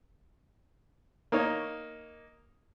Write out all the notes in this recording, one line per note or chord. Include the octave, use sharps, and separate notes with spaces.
A#3 D#4 C#5